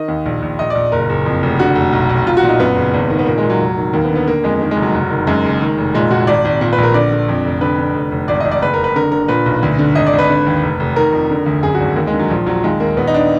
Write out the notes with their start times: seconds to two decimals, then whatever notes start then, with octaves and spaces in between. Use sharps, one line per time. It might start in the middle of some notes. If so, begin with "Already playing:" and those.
Already playing: D#3 D#5
0.08 D#2
0.26 A#1
0.42 A#1
0.59 A#1 D#5
0.70 A#1 D5
0.92 F#1 A#4
1.10 F#1
1.26 F2
1.43 F1
1.59 D3 F#4
1.76 F1
1.93 B1
2.09 B1
2.26 B1 F4
2.37 F#4
2.43 A#2
2.49 D#4
2.59 F#2 B3
2.76 F#1
2.94 G#1
3.10 D#3
3.19 B3
3.26 A#2 A#3
3.38 G#3
3.43 A#2
3.50 F#3
3.60 F1
3.77 D#3
3.93 D#2 A#3
4.04 B3
4.10 D3
4.16 B3
4.27 D3 A#3
4.44 F2 G#3
4.61 D#3 A#3
4.71 G#3
4.77 F1
4.82 F#3
4.95 F#1
5.11 D#3
5.27 F#2 G#3
5.44 F#1
5.61 D#3
5.78 F1
5.94 A#2 G#3
6.11 A#2 F#4
6.27 G#1 D5
6.45 G#1
6.61 A#2
6.73 B4
6.78 A#1
6.83 A#4
6.94 D3 D5
7.12 D3
7.29 F2
7.45 F1
7.61 D3 B4
7.78 D3
7.95 F1
8.12 F1
8.28 G#1 D5
8.40 G#1 D#5
8.52 D5
8.62 F#1 B4
8.74 F#1 A#4
8.84 B4
8.96 D3 A#4
9.12 D3 A#4
9.28 A#2 B4
9.46 B1
9.63 D2
9.79 D3
9.95 G#1 D#5
10.06 D5
10.13 G#1
10.19 B4
10.30 D3
10.46 D#2
10.63 F1
10.80 F1
10.96 D#3 A#4
11.12 F2
11.30 D3
11.46 D2
11.63 F#2 G#4
11.75 F#4
11.80 G#1
11.96 D#2 A#3
12.07 G#3
12.13 D3
12.19 F#3
12.30 A#1 F3
12.46 A#1 F#3
12.64 D#2 G#3
12.80 D#2 A#3
12.97 A#1 B3
13.07 D#4
13.14 D4